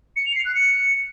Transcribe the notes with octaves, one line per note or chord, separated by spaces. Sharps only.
C#7
F7
C7
F#6
C#7